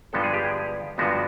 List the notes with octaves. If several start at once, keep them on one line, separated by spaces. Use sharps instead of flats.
G2 D3 F3 G#3 B3 A4
G#4
G4
G#4
G2 D3 F3 G#3 B3 F#4